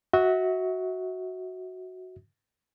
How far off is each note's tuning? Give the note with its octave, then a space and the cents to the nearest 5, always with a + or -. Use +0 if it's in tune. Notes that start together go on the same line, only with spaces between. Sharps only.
F#4 +0 E5 -35